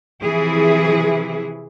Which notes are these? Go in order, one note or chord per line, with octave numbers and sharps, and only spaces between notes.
C3 E3 F3 E4 G#4